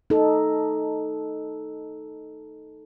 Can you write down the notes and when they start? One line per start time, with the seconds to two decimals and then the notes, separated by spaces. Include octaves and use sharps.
0.10 D#4 A4